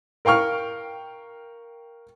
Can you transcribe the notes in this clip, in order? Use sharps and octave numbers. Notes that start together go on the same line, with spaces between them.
A#4 F5 G5 C#6 F6